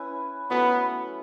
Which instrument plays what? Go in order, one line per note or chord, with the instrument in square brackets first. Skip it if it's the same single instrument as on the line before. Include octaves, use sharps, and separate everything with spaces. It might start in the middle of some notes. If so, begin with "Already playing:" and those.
Already playing: [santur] C#4 E4 B4
[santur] F#3 A3 C#4 E4 [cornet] B3